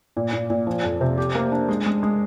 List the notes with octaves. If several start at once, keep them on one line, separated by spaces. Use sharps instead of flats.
A#2
A#2
A#2
F3
F2
C3
G4
A#3
D4
G#3
G#3
G#3